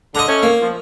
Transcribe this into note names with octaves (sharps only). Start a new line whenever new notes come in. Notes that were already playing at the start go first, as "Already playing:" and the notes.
D3 D#5 A#5
A3 C#4
A#3
F3